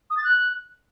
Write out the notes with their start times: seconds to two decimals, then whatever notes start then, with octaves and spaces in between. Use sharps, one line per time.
0.10 D#6
0.17 A6
0.24 F#6